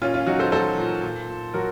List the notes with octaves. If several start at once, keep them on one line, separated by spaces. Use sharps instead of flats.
A#2 C#4 F4
C#4 F4
F#3 D#4 F#4
A4 C5
F#3 A4 C5
A#2
A#2
A#2
F#3 F#4 A#4